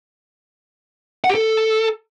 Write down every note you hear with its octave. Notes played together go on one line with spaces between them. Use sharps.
F#5
G4
A4